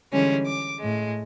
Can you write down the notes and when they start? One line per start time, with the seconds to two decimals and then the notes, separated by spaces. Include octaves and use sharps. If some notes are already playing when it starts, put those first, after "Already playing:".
0.13 D3 E3 G3 G#3 C#4
0.45 D6
0.81 A2 G#3